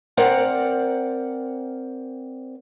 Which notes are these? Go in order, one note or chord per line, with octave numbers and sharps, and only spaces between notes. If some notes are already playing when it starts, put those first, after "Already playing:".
C4 A#4 D5 F#5